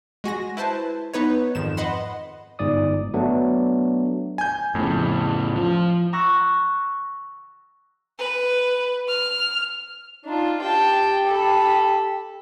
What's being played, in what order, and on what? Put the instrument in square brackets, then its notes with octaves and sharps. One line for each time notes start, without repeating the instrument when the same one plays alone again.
[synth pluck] G#3 F#4 G#5 A#6
E4 B4 C5 A5
B3 D#4 B4 C#5
F2 G#2 D#3 E7
B4 D#5 F#5 B5 C6
[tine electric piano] G1 G#2 D5 D#6
F#3 A3 B3 D4
[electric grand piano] G#5 G6
[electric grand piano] F2 [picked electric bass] A2 C#3
[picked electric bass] F3
[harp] A#5 C#6 E6 F#6 A6 A#6
[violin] B4
F6
[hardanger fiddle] D4 F4 [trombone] D#4
[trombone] G4 [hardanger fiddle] G5 A5
[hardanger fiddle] A4 B5